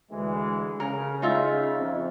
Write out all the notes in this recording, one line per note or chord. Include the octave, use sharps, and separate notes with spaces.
D2 E3 G#3
C#3 A#4
D#4 F4 E5
F2